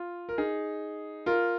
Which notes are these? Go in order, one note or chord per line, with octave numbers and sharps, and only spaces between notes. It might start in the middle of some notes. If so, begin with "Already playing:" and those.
Already playing: F4
A#4
D#4 G#4
F4 A#4